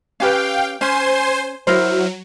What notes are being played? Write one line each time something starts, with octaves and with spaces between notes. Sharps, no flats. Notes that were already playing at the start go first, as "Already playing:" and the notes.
C#4 G4 B4 F5 G5
C#4 C5 G#5 C6
F#3 E4 A#4 C5